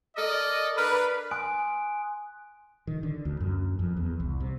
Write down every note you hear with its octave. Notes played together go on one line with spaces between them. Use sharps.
A4 A#4 D5 D#5
D4 A#4 B4
G#5 C6 D#6 F#6 D7
D#3
D3
D2
F#2
F2
E2
C2
C3